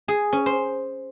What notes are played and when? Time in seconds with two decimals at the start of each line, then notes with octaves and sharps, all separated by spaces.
0.08 G#4
0.33 C#4
0.46 C5